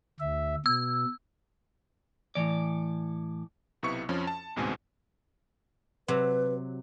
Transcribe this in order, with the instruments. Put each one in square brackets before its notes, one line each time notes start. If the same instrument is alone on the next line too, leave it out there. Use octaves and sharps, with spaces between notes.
[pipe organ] D2 E5
[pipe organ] B2 [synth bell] E6
[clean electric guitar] A2 E3 D5
[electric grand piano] B1 C3 B3 E4 C#6 C#7
F2 F3 C#4
A5
A1 D2 G#2 B2 C4 G#5
[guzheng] C3 F#3 [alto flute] B4